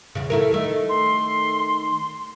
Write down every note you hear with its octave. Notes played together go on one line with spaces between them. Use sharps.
E2 C#3
A3 E4 A#4
D#3 A3
C6